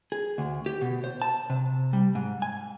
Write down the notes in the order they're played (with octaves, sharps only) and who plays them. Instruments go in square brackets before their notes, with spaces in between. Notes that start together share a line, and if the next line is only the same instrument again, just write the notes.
[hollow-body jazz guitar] G#4
D2
G4
B2
C5
A5
C3
G3
G#2
G#5